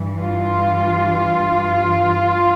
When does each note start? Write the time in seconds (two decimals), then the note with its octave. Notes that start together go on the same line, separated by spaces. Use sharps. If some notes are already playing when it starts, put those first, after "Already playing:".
Already playing: G2 E3
0.19 F4